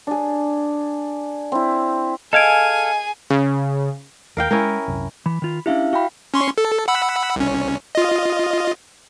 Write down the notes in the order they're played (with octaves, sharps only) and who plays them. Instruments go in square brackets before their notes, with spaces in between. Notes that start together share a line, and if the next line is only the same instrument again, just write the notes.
[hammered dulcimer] D4 G#4
C4 E4
[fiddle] G#4 G#5 [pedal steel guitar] A4 F5 [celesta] D#5 G#6 D7
[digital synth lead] C#3
[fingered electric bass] D#2 [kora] A#4 F5 G5
[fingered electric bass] G#3 [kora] C#4 E4 A#4
[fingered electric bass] C2 F#2
[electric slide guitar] E3 [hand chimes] B5
[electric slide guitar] D#3 F4
[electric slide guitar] C#4 D4 G4 [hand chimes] E4 E5 F5
[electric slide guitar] F#4 [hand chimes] F5 G5 B5
[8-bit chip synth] C#4 C6 C#6
A4
F#5 B5 E6
C2 C#4
F4 D#5